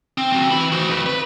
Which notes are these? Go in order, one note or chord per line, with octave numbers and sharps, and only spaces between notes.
C4
F#3 C4
E3 B5
F#4 C5
F2 B4
B4